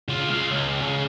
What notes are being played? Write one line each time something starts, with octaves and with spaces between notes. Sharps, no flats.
C#3 F4
G#3 F5
C#2
C#3